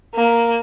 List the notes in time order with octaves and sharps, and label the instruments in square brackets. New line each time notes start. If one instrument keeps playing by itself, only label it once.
[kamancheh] A#3